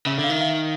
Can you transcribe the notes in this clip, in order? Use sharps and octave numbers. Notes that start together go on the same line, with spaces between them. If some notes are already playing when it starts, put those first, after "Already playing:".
C#3 E5
D3
F5
D#3
F5